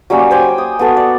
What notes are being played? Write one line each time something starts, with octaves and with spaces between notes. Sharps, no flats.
F#3 G3 A#3 C#4
C5 G5 G#5 D6
D#6
B3 F#4 A4 F#5
D5